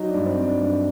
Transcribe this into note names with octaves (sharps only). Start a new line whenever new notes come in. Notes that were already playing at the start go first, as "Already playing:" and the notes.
Already playing: F#3 D#4
D4
G2
C4
G2
D4
G2